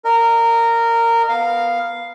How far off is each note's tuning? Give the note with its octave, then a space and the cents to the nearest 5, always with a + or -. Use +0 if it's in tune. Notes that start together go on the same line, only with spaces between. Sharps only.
A#4 -15 D#5 -15
B3 +0 F5 +0